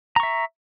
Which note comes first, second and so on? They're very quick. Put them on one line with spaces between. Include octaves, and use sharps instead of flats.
A#5 C#6 E5